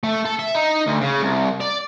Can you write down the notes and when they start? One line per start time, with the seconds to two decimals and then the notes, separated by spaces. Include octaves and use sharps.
0.04 A3
0.25 A4
0.39 E5
0.55 D#4
0.86 D2
1.01 C#3
1.21 C2
1.60 D5